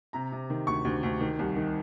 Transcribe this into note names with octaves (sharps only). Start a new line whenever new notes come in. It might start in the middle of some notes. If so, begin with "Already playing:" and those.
C3 A#5
C3
D#3
D2 C#6
D2
D2
D#3
C2
D#3